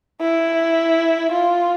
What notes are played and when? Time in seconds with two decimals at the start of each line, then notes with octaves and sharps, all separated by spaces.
0.21 E4
1.32 F4